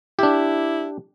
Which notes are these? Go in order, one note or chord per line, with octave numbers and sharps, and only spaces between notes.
D4 E4 G4